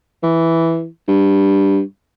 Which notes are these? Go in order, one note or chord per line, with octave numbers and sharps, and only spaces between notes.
E3
G2